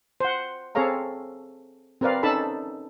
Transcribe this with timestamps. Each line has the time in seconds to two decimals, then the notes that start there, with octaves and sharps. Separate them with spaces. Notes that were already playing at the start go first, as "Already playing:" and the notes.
0.20 C5 F#5
0.75 C4 G#4 A4 C#5 F5 A#5
2.01 C4 A#4 B4 D5 F5
2.23 C#4 D#4 A4 A5 B5